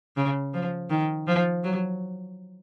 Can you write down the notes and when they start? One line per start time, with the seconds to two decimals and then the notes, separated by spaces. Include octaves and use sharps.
0.17 C#3
0.54 F3
0.90 D#3
1.27 F3
1.64 F#3